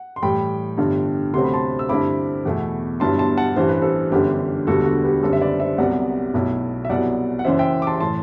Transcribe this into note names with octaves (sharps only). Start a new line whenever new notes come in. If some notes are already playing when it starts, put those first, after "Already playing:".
Already playing: F#5
C6
A2 E3 G3 G5 B5
G1 G2 D3
D2 C3 F#3 A3 C4 C6
B5
A5 C6
E6
G2 D3 A3 C4 E4 B5 D6
E2 B2 A3 E4
G1 G2 F#3 B3 E4 A5 C6
A5 C6
F#5 A5
A1 G2 E3 C5
B4
A4 C5
G1 F#2 D3 G4 B4
E1 D2 D3 G3 B3 F#4 A4
F#4
G4 B4
F#1 F#2 D3 G3 C4 A4 C5
E5
B4 D5
C5 E5
C2 C3 F#3 B3 D5 F#5
B1 B2 A3 E4
E5
C2 B2 F#3 B3 E4 D5 F#5
F#5
F#1 F#2 E3 C5 E5
E5 G5
D6
A5 C6
A2 E3 A5 C6